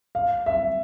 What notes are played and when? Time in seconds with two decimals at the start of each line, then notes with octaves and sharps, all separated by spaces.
0.15 F5
0.46 E5